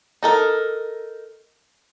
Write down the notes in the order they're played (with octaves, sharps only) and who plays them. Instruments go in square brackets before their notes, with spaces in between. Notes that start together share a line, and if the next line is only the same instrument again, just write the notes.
[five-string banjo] D#4 A4 A#4